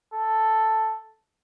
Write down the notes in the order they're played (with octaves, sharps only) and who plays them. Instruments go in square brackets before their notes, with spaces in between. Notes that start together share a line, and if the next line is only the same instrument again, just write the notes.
[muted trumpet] A4